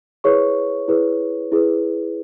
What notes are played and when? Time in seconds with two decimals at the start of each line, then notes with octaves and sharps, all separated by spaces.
0.24 E4 G#4 B4 C#5 C#6
0.88 E4 G#4 B4
1.52 E4 G#4 B4